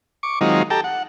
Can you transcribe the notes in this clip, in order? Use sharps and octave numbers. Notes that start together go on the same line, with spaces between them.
C#6 D6
D#3 F#3 G#3 C4 D#4 F4
G4 A4 G5 A5 A#5
F#5